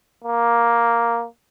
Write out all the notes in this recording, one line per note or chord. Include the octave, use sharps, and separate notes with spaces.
A#3